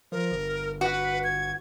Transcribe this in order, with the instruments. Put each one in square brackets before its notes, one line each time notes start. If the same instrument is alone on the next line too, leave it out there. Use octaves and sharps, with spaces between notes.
[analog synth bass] F3 [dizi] A#4
[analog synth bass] G1
[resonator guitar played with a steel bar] F#4 [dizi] B4
[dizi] G#6